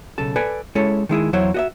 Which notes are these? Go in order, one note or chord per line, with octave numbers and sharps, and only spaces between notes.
B1 C#3 A4 A5
A4 B4 D5 G#5
G#3 C#4 E4 A4 C#5
D#3 G#3 E4 G#4
E2 F#3 E4 C5 C#5
F#4 D#5 E5